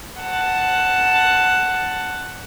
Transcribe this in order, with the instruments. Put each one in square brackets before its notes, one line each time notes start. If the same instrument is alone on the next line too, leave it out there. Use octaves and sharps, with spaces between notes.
[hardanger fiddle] F#5 A5